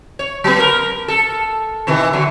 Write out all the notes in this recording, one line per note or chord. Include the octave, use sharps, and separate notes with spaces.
C#5
F#3 B3
A#4
A4
B2 D#3 E3
D3 F#3